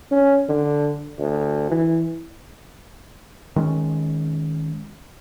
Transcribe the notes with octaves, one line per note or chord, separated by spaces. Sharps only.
C#4
D3
D2
E3
D#3 G#3 C4 C#4